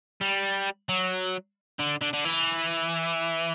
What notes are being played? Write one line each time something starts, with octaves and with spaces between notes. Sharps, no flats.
G3
F#3
D3
D3
D3
E3